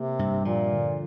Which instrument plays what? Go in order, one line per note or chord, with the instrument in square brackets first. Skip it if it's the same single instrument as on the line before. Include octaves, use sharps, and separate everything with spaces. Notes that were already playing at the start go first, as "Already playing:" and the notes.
Already playing: [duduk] C3 [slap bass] A#3
[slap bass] G2
[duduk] A#2 [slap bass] F3
[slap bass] D3